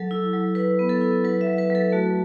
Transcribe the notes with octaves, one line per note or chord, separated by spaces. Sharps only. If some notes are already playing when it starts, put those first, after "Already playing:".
Already playing: F#3 A4
E4
F#3
E4 B4
B3
A4
E4
F#3 B4
E5
F#3
B4
F#3
A4
A3 F#4